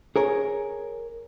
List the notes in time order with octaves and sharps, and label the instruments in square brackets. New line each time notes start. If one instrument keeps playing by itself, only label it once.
[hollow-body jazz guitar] G#4 A#4 C#5